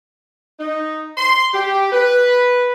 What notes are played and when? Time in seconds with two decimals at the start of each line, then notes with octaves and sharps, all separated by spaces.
0.60 D#4
1.17 C6
1.54 G4
1.92 B4